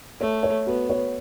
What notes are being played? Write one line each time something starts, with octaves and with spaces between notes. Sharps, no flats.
A3 C#5
C#5
B3 F#4
C#5